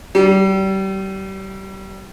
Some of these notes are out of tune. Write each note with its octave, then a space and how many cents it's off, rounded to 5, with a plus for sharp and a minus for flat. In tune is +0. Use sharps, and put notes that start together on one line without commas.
G3 -30